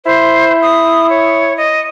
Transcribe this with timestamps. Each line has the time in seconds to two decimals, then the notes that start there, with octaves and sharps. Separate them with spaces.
0.05 E4 C5
0.62 D#6
1.10 C#5
1.58 D#5